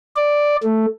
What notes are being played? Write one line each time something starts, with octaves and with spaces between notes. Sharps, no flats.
D5
A3